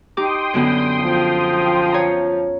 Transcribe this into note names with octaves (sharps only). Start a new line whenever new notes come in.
D#4 G4 G5 C6 D6 D#6
F#2 D3 B3
F3
C#5 A#5